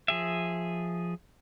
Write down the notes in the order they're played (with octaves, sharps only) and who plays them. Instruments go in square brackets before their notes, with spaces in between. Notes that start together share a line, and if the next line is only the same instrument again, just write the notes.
[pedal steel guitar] F3 G#4 E5